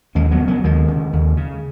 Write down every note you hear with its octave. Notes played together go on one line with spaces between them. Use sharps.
D#2 G#3 C#4
F#3 B3
C#3
F#3 B3
D#2 D#3 G#3
C#3
D#2
C#3